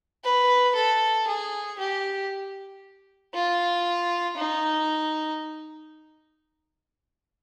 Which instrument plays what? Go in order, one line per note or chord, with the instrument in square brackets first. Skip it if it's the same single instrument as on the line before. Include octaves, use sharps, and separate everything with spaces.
[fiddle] B4
A4
G#4
G4
F4
D#4